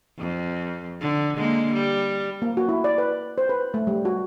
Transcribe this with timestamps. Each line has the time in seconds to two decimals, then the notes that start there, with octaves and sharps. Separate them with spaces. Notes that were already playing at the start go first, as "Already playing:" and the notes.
0.18 F2
1.01 D3
1.37 D3 G#3 A#3
1.73 G3
2.42 A#3
2.57 F#4
2.69 E4
2.84 D5
2.98 B4
3.38 C5
3.49 B4
3.74 A3
3.87 G3
4.05 F#4